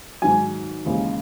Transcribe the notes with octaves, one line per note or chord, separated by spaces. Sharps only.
G#2 D#3 F#3 G#5
D#2 C#3 E3 G#3